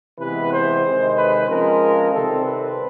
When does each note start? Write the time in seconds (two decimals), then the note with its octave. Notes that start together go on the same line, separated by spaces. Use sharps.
0.19 C3 E3 G#3 B3 B4
0.52 C5
0.84 C3 D#3 G#3
1.16 B4
1.48 C#3 F3 G#3 C4 A#4
2.12 C3 D#3 G3 C4 A4
2.44 B4